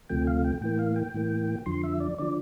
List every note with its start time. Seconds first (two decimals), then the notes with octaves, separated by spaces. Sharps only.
0.09 D2 C3 F3 A3 G5
0.27 F5
0.44 G5
0.61 A2 E3 A#3 G5
0.79 F5
0.96 G5
1.14 A2 E3 A#3
1.66 F2 D3 F3 C6
1.84 E5
2.00 D5
2.18 D3 F3 D5